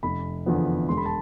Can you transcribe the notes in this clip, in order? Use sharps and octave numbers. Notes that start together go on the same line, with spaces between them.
F1 B5
E2 D3 F3 B3
E1 C6
B5
A5